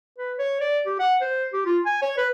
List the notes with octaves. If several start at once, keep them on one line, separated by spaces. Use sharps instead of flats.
B4
C#5
D5
G4
F#5
C5
G4
F4
G#5
C#5
B4